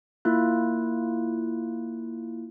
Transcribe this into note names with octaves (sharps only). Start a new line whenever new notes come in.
A#3 E4 F4 F#6